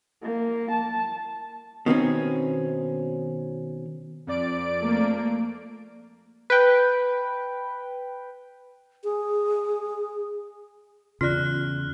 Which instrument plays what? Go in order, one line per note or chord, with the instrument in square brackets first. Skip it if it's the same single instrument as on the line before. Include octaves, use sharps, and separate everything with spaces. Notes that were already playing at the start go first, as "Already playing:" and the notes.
[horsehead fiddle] A#3
A5
[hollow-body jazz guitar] B2 D#3 C4 C#4
[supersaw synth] F2 D5 D7
[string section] A3 A#3
[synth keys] B4 G5
[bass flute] G#4
[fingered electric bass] E2 C#3 [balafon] F4 D5 [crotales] F6 F#6